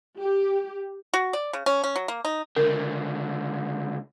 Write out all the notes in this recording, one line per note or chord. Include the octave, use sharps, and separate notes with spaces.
G4
F#4
D5
C#3
C#4
C#4
F#3
A#3
D#4
C#2 D3 A#4